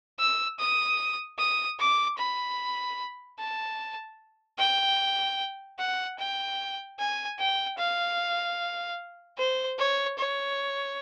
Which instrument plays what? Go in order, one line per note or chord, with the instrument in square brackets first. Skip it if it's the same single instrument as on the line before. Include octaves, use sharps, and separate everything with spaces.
[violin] E6
D#6
D#6
D6
B5
A5
G5
F#5
G5
G#5
G5
F5
C5
C#5
C#5